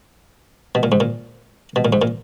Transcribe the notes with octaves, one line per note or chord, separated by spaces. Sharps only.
B2
A#2
G#2
A#2
B2
A#2
G#2
A#2